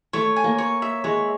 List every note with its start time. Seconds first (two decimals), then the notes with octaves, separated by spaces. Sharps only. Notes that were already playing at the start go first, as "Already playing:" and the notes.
0.13 A3 C#5
0.36 G#5
0.44 A#3
0.58 C#5
0.82 E5
1.04 G#3 C#5